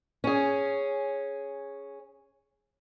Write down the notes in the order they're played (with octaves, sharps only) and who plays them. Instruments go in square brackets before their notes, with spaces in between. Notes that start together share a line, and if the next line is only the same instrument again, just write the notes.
[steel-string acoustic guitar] C#4 G#4